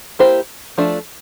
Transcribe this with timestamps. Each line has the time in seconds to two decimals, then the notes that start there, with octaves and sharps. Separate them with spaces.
0.19 A#3 E4 G4 C5
0.78 F3 A3 D4